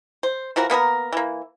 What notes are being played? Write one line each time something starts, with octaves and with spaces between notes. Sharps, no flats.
C5
E3 F3 F#4 A#4
A#3 B3 G#4 A#4
E3 A#3